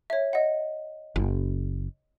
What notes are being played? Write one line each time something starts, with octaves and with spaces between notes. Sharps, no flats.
C#5 E5
D#5 F#5
F#1